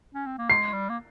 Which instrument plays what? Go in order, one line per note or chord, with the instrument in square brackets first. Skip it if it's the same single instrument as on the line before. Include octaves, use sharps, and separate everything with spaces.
[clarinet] C#4
C4
A#3
[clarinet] G#3 [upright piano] C7
[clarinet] G3
A#3